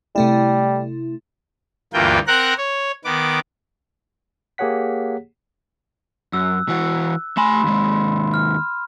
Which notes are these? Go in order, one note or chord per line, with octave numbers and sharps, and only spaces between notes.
C3 G3 A3 E4
D2 G2 E3 A#3 F4 G5
C4 A#4 F#5 A#5 F#6
C#5
D#3 B3 D6
A#3 G4 G#4 C#5 F#5 B6
F#2 E6 F#6
E3 F#4
A3 G#5 B5 C6 E7
D#2 G#3
F6